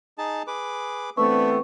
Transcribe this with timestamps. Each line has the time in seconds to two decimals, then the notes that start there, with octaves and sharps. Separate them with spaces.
0.18 D#4 G#4 A5
0.47 G#4 B4 D6
1.17 E3 A3 B3 C4 D4 B4 E5 C#6